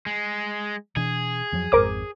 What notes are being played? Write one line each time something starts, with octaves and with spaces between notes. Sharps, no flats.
G#3
B2 E3 D4 G#4
F2 F3 F#3
G#1 F2 G#2 A#4 C5 D6